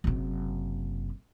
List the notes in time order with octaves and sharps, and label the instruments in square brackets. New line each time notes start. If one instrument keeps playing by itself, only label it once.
[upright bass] F#1 C3